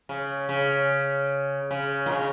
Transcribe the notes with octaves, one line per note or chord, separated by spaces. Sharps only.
C#3
C#3
C#3
A#2
C#3